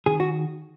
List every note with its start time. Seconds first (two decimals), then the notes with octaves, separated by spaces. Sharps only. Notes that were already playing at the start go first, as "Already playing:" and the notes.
0.06 D#3 G#4
0.20 F#4